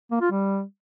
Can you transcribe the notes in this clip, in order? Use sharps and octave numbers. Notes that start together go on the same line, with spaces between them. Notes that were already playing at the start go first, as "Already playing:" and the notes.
A#3
F4
G3